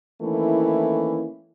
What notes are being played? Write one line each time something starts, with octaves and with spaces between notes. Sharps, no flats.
D#3 E3 A3 A#3 C#4 E4